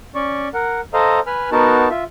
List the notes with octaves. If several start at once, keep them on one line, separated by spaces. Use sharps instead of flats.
C#4 D5 C#6
A#4 F#5
A4 C5 D#5 F5 A#5
B4 G#5 B5 F6
B3 D#4 F#4 A#4 A5
F4 E5